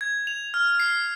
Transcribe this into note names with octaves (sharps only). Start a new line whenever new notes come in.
G#6
F7
F6
C7